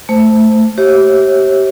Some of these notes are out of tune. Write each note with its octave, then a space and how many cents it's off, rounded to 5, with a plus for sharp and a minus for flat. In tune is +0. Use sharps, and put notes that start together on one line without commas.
A3 +0 C5 -10
G4 -25 C#5 -45 E5 -35